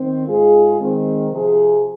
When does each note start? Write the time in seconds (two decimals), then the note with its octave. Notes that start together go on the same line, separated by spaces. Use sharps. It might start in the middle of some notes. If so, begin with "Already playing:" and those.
Already playing: D#3 C4
0.27 G#2 G#3 F4 G#4
0.78 D#3 G#3 C4
1.30 C3 F3 C4 G#4